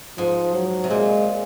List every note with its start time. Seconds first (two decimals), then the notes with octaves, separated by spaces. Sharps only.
0.18 G#2 F3
0.55 F#3
0.84 C3
0.90 A#2 G#3